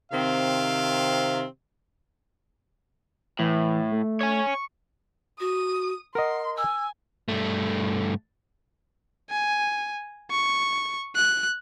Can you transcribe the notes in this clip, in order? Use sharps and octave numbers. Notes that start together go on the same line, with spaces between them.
C3 D#3 C4 F5
A2 E3
A3
C#5 G#5
C#6
F#4 D#6
A#4 D#5 F#5 C6
G#5 E6
G2 A3
G#5
C#6
F#6